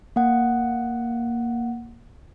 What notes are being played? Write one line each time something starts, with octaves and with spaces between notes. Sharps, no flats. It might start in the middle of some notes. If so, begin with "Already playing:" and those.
A#3 F#5